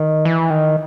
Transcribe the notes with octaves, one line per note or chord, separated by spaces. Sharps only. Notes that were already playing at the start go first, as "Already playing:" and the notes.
Already playing: D#3
E3
D#3